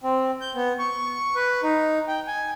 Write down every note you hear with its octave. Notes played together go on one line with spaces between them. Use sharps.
C4
G6
B3
C#6
B4
D#4
G5
G#5